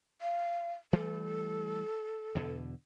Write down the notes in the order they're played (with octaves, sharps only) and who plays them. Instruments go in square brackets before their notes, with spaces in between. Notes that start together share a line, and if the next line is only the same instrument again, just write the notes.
[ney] F5
[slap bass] E3 G3 A3 [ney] A4
[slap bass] E2 B2 D3